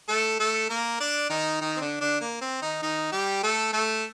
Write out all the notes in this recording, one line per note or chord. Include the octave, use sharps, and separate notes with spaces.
A3 A4
A3 A4
A#3 A#4
D4 D5
D#3 D#4
D#3 D#4
C4
D3 D4
D3 D4
A#3
C4
D#3 D#4
D#3 D#4
G3 G4
A3 A4
A3 A4